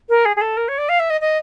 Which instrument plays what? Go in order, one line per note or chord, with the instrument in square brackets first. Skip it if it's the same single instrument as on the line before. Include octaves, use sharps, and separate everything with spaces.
[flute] A#4
G#4
G#4
A4
A#4
C#5
D5
F5
E5
D#5
D#5